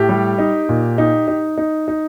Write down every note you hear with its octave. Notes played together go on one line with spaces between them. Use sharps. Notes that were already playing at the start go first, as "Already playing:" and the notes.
Already playing: A2 G4
G3
D#4
A#2
D#4
D#4
D#4
D#4